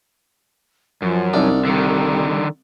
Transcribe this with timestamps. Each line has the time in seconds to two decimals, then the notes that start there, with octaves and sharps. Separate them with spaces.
1.02 F#2 F3
1.34 C2 D4 D#4
1.65 D3 D#3 G3